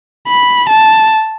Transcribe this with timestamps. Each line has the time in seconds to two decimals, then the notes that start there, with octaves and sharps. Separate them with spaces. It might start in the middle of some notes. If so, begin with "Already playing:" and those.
0.28 B5
0.70 A5